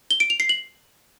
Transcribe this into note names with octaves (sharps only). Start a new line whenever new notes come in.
G7
D7
F7
C7
F#7